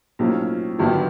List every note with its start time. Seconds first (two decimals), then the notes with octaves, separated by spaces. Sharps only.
0.19 B1 A2 F3 A#3 C#4
0.79 G1 G2 D#3 F#3 B3